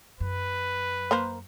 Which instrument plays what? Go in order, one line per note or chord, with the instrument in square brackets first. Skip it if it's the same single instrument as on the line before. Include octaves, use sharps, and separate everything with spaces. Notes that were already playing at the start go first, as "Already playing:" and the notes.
[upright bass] F#2 [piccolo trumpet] B4
[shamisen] A#3 A#4 C5